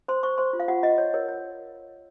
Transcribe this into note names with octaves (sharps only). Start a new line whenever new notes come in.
C5 C6
C5 C#6
C5 C6
F4
F5
F4 F#5
F4 D#5
C#5
A#4 C#5
C#5